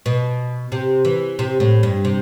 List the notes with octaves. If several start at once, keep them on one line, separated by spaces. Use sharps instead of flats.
B2
C3
E3
C3
A2
G2
C3